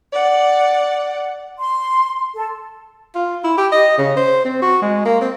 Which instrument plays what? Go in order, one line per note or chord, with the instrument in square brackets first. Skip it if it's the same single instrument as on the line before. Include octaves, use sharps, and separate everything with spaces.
[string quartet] D5 F#5
[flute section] C6
A4
[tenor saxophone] F4
E4
G4
D#5
C#3
C5
C4
F#4
G#3
A#3
C4